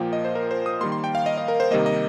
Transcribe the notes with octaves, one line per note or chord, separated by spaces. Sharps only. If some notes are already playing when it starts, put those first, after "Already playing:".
Already playing: A#2 F3 A#3 G5
D#5
C5
A#4
C5
D#6
D#3 G3 A#3 C6
C6
G5
F5
D#5
D#5
A#4
C5
C3 D#3 G3 A#3 D#5
D#5